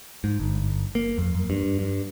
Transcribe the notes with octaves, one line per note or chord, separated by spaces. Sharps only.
G#2
G1
A#3
F2
F#2
G2
G2